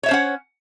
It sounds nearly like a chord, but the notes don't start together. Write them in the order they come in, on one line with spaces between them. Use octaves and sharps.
C#5 E5 C5 C#4 F#5